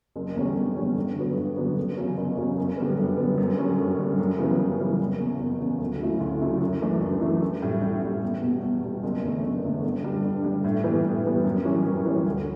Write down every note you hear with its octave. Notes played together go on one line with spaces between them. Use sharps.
F#1
E2 D3 G3 C#4
F#1
E2 D3 G3 C#4
G2
D3 F#3 B3
G2
D3 F#3 B3
F#1
E2 C#3 F#3 C#4
F#1
E2 C#3 F#3 C#4
F#2
D3 G3 B3
F#2
D3 G3 B3
F#2
D3 G3 C#4
F#2
D3 G3 C#4
F#2
C#3 E3 G3 B3
F#2
C#3 E3 G3 B3
F#1
E2 C#3
F#1
E2 C#3
D2
C#3 F#3 A3 E4
D2
C#3 F#3 A3 E4
F#2
E3 A3 D4
F#2
E3 A3 D4
A1
A2 G3
A1
A2 G3
E2
B2 G3
E2
B2 G3
F#1
E2 D3 A3
F#1
E2 D3 A3
G2
D3 G3 D4
G2
D3 G3 D4
A2
E3 G3 B3
A2
E3 G3 B3
F#2
E3 G3 C#4
F#2
E3 G3 C#4
D2